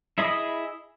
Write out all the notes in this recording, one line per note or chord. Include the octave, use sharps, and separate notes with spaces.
E4 G#4 D#5 B5 D#6